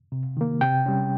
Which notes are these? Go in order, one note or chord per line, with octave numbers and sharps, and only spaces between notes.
C3
D#3 A#3
C3 G5
G3 C#4